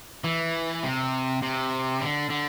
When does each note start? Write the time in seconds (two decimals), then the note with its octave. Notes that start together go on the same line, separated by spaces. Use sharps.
0.24 E3
0.83 C3
1.43 C3
2.01 D3
2.30 D3